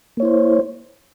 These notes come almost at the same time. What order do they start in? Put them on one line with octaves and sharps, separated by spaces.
A#3 C#5 E4 C5